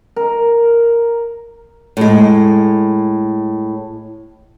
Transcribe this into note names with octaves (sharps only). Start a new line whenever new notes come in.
A#4
A2 G#3